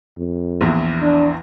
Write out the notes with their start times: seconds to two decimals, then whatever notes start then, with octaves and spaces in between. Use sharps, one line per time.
0.18 F2
0.61 A#1 E2 E4
1.02 D4